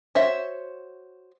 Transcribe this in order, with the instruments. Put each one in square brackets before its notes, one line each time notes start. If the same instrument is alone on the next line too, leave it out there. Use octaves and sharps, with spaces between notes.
[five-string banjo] F#4 C5 C#5 E5